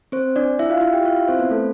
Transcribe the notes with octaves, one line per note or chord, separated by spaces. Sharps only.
C4 C5
D4 D5
E4 E5
F4 F5
E4 E5
G4 G5
F4 F5
E4 E5
C4 C5
B3 B4
A3 A4